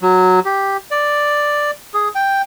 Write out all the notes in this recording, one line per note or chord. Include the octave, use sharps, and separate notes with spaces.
F#3
G4
D5
G#4
G5